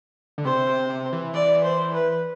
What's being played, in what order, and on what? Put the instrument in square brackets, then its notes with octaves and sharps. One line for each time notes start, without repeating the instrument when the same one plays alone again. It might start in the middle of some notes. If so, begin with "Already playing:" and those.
[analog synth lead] D3
[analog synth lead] C3 [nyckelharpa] C5
[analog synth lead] C3
C3
E3
[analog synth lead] E3 [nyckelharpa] D5
[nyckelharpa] C5
B4